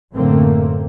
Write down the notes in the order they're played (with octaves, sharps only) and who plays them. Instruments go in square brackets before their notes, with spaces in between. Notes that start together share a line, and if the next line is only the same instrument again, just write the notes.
[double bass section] F#2 A2 D3 A3 A#3 C4